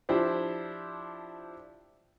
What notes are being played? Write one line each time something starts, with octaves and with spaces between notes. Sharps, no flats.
F3 D4 E4 G4 C5